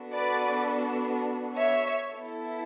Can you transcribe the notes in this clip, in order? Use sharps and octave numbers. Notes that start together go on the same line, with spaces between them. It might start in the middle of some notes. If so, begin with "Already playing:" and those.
Already playing: B3 D4 F#4 A4
B4 D5
C#5 E5
B3 E4 A4